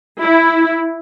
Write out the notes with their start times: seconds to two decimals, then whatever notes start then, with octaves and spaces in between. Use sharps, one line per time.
0.21 E4